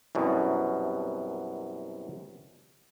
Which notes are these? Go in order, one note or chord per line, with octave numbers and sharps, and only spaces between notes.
C2 F#2 B2